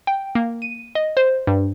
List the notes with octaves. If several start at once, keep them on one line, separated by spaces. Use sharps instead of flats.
G5
A#3
D#7
D#5
C5
G2